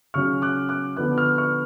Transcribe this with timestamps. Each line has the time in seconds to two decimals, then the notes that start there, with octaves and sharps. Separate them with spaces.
0.14 C#3 F#3 C#4 C#6 F6
0.42 D6 F#6
0.69 D6 F#6
0.96 D3 F3 B3 D6 F#6
1.17 C#6 F6
1.38 C#6 F6